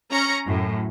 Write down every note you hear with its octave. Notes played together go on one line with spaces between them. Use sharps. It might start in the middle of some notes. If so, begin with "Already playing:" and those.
C#4 A#5 C#7
F#2 A2